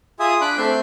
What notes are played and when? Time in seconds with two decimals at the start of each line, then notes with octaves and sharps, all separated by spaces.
0.20 F4 G#4 E5 G#5 D#6
0.41 D4 B5 D6 F#6
0.58 A3 C4 E5 C6 G6